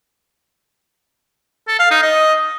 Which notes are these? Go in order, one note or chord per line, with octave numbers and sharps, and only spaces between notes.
A4
F5
D#4
D#5